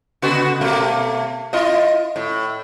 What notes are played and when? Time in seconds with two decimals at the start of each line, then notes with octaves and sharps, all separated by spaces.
0.22 C#3 B3 F#4
0.61 B2 A3 A#3
1.53 E4 F4 D#5
2.16 A2